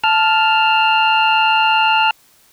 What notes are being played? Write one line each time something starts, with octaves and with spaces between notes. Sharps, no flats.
A5 F6